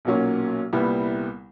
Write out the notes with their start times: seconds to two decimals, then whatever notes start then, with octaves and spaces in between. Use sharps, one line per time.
0.05 B1 A#2 F#3 A#3 C#4
0.73 C2 A#2 G3 B3 E4